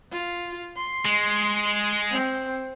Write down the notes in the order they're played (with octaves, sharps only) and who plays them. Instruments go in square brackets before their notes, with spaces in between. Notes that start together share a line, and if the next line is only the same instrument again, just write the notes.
[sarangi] F4
C6
[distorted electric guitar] G#3
[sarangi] C4